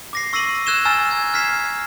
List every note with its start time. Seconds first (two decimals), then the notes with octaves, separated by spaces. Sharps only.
0.13 D6 A#6 C7
0.33 C#6 E6 A#6 C7 D#7 F#7
0.66 E6 F#6 G#6 E7 G7
0.85 G#5 A#5 E6 F6 A6 E7
1.11 G#6
1.34 F6 G#6 B6 C7 E7